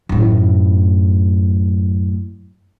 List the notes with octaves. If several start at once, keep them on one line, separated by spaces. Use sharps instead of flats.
F#2 A2